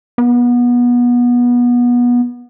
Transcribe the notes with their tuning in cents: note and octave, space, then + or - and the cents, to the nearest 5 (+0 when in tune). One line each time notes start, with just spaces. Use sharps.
B3 -25